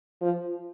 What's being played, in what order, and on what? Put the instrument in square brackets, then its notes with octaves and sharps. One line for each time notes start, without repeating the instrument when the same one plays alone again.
[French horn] F3